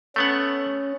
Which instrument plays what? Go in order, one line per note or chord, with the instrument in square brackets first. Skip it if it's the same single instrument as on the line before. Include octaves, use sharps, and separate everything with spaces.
[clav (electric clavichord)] A3 B3 F#5 [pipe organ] C#4